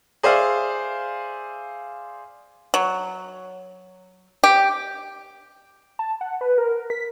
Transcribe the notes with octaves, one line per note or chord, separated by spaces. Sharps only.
G#4 C5 D5 E5 F5
F#3
G4
A5
F#5
B4
A#4
B6